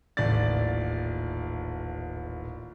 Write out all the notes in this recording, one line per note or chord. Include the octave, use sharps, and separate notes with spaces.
D#1 A1 D5 A6